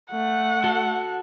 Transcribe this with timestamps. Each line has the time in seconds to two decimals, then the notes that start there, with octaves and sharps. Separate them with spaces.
0.12 A3 F#5
0.64 F#4 A4